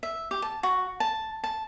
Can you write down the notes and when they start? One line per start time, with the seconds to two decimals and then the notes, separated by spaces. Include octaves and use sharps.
0.03 E5
0.31 G4
0.42 A5
0.63 F#4
1.00 A5
1.44 A5